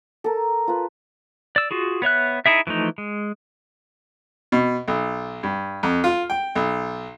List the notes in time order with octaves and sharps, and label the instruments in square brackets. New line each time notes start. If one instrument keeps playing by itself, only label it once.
[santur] A4 A#4
F4 B4
[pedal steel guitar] D5 E6
F4 F#4 G#4
B3 C#5 E5 F#6
D#4 E4 G#4 E5
E3 F3 A3 D#4
G#3
[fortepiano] B2
B1
G2
F2
F4
G5
B1